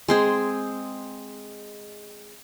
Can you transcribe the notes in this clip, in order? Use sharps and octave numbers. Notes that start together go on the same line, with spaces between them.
G#3 C4 G#4